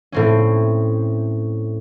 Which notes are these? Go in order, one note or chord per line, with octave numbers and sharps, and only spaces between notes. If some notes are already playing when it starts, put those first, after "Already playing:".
A2 C4 C#4